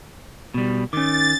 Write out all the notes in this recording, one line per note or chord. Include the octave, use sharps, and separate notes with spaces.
B2 G3
D#3 C#4 D6 A6